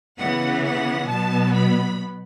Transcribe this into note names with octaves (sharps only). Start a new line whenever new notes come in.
C#3 E3 B3 F#5
F#5
B2 F#3 B3 A5
B5